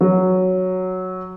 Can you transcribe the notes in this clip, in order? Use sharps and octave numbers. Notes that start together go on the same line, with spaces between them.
F#3